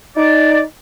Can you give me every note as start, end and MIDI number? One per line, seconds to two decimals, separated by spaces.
0.16 0.61 63
0.16 0.61 74